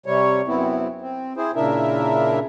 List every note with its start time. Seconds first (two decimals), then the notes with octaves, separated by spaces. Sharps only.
0.06 C3 G3 C#5
0.48 F#2 B3 C4 E4
1.02 C4
1.37 C4 E4 G#4 C5
1.56 A#2 C#3 D4 E4 A#4 E5